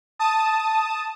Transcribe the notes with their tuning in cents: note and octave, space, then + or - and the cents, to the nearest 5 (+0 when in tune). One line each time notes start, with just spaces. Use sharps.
A5 +0 D#6 +0